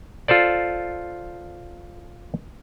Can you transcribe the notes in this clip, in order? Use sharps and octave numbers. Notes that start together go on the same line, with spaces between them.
F4 A4 C5 D5